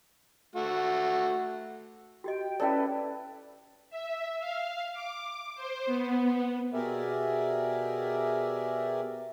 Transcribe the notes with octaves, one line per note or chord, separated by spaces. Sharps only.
A3 F#4
F#4 G4 D#5 G5
C#4 E4 A4 B4 C#5 D5 G5
E5
F5
D6
C5
B3
B2 G4 G#4 A#4 D5 E5